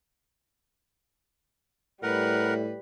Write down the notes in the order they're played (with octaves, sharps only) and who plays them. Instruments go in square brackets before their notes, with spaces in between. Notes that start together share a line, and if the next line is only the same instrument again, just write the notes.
[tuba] A2 [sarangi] G3 [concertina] A#4 F#5 [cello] B4